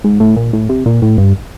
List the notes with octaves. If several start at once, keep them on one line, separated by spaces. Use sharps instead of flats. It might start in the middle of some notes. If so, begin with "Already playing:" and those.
G#2
A2
A#2
A2
C3
A#2
A2
G2